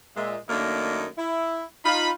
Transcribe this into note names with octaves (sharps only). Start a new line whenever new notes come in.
A#2 G#3 E5
F#2 D#3 A3 A#3 D4 D#4
E4
D#4 F4 B5